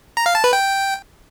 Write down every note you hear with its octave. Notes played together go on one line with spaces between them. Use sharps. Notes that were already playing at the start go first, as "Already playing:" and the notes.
A#5
F5
A5
B4
G5